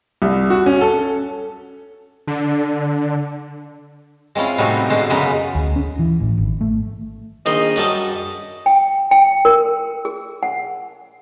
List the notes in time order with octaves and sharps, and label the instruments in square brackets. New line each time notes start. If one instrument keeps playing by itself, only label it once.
[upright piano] C2
F#4
C#4
A4
[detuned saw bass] D3
[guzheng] G#3 C4 C#4 E4 F4
A2 C3 G3 D#4 F#4 A4
B2 D3 G#3 C5
F#2 C#3 G#3 B3 B4 A#5
[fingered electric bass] D2
C#4
E3
A1
G#1
A3
[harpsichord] A#1 D#3 C6 [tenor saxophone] D#5
[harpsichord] F#2 G3 A4
[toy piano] G5
G5
A#4
G#4
F#5